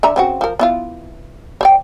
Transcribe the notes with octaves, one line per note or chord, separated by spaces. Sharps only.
D3 E5 A#5
C#3 C4 F#4
F3 A#4
B3 E4 F4
C5 D5 G5